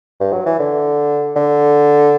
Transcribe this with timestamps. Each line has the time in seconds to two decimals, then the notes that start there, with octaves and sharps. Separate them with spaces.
0.20 G2
0.33 F#3
0.46 E3
0.59 D3
1.36 D3